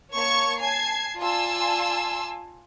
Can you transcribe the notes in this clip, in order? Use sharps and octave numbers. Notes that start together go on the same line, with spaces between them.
A#3 C#5 A5 C#6 G#6 C#7
G#5 A5 G#6 C7
F4 D5 G#5 A5 C6 E6